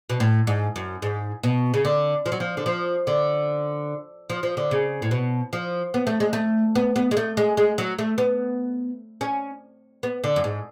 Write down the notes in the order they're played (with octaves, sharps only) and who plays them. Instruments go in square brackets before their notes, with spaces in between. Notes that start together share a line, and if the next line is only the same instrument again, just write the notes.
[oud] B2
A2
G#2
F#2
G#2
B2
C#3
D3
F3
F#3
F3
D3
F3
D3
F3
F3
D3
C#3
A2
B2
F3
B3
A3
G#3
A3
B3
B3
G#3
A3
G#3
G#3
F#3
A3
B3
C#4
B3
D3
F#2
G#2